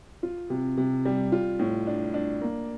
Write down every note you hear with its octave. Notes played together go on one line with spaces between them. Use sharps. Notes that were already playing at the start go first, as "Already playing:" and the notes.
F4
C3
C3
G3
F4
A2
D4
D4
A#3